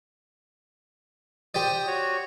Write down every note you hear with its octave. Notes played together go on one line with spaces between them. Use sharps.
G4 C5 D5 D#6
F#4 C#5